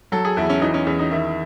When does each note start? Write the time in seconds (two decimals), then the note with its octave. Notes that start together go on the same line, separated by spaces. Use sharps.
0.12 F#3 A4
0.25 G#4
0.37 E2 E4
0.50 C#4
0.62 E3 D#4
0.74 C#4
0.87 E2 C#4
0.99 D#4
1.11 D#3 E4